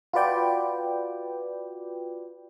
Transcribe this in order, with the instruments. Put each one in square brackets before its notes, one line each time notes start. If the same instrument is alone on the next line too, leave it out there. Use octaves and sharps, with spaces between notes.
[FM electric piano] F4 F#4 B4 D5 G5